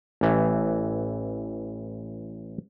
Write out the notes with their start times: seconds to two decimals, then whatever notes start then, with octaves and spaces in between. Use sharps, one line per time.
0.21 A1 E3